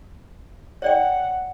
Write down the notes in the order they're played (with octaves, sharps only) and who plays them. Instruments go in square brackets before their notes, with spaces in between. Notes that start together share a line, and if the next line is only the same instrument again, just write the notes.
[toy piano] C#5 D5 G5 [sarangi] F#5